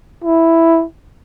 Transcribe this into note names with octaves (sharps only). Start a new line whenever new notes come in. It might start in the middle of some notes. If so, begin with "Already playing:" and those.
E4